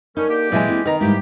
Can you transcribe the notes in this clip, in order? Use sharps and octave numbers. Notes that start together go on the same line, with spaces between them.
D3 G3 C#4 D#4 A#4
D3 A#3 G4
A#2 E3 F#3 G#3 E5 G#5
C4 E4
D#3 B4 D#5 A#5
G#2 G3 G#3 A#3 E4 G4